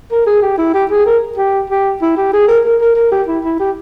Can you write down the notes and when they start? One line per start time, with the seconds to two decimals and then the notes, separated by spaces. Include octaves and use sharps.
0.11 A#4
0.26 G#4
0.42 G4
0.58 E4
0.74 G4
0.91 G#4
1.06 A#4
1.38 G4
1.70 G4
2.02 E4
2.17 G4
2.33 G#4
2.48 A#4
2.65 A#4
2.81 A#4
2.96 A#4
3.12 G4
3.28 E4
3.44 E4
3.60 G4